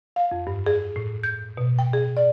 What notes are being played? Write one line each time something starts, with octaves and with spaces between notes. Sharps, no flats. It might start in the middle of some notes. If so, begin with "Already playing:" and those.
F5
F2
G2
G#4
A2
G6
B2
G5
G#4
D5